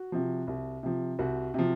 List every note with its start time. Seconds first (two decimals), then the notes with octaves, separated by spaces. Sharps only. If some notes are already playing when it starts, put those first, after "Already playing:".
Already playing: F#4
0.12 C3 F3
0.47 C2
0.83 C3 F3
1.19 C2 F#4
1.54 C3 F3